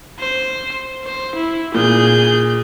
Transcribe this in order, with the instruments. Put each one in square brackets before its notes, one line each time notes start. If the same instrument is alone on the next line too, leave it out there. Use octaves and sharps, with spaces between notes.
[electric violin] C5
C5
E4
[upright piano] A#2 [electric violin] G#4 G6